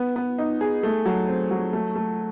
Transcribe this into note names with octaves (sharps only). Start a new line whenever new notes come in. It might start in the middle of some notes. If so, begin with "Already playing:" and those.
Already playing: B3
B3
D#4
G#4
A3
F#3
C4
F#3
A3
A3